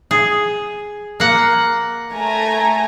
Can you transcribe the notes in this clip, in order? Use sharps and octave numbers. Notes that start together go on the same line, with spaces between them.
G#4
A#3 F#5
A3 G#5 A#5